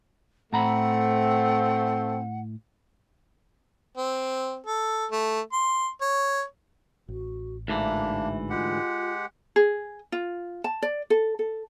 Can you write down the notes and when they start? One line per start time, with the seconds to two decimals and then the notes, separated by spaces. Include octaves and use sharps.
0.53 A2 A3 C4 F#5 A#5 B5
3.97 C4
4.66 A4
5.11 A3
5.52 C6
6.01 C#5
7.08 A1 F#4
7.68 D2 G#2 E3 A#3 D4 E5
8.50 G#3 F4 G4 F#5
9.56 G#4
10.12 F4
10.64 A5
10.82 D5
11.10 A4
11.39 A4